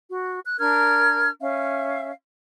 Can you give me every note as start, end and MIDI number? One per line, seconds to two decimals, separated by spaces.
0.08 0.39 66
0.45 0.58 90
0.59 1.29 62
0.59 1.29 70
0.59 1.29 89
0.59 1.29 92
1.40 2.12 61
1.40 2.12 76
1.40 2.12 77